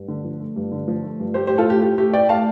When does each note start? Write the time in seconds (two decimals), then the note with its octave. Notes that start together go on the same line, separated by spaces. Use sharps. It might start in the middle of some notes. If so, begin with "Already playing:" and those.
Already playing: G2
0.08 D3
0.25 F3
0.40 A3
0.56 G2
0.72 D3
0.88 F3
1.03 A3
1.20 G2
1.34 A3 G4 C5
1.47 A2 G4 C5
1.58 F4 A4
1.67 A3 G4
1.82 A2 G4
1.98 A3 G4
2.13 A2 D5 G5
2.29 A3 F5 A5